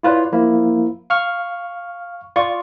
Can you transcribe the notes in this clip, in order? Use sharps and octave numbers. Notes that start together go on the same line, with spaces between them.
E4 F4 B4 C#5 D5
F3 A#3 E4
F5 C#6 F6
F4 D5 C6 C#6